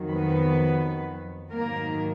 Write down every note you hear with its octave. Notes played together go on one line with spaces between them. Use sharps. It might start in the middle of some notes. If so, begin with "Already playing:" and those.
Already playing: F2 D#3 F#3
B3 B4
G#2 D#3 F#3 A#3 A#4